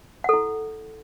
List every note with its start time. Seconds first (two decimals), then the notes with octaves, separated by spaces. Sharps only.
0.24 F#5
0.29 A4
0.33 E4